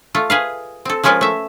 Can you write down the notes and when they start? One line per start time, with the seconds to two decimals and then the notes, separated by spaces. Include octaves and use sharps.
0.15 A3 F4
0.30 G#4 B4 F5
0.85 C4 A4
1.03 F3 G#3 C#4 F4 A#4 B4
1.21 A3 E5